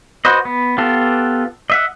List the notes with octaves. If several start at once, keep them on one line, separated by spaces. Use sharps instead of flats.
F#4 B4 C5 D#5
B3
B3 F4 G4 A4
D#5 E5 F#5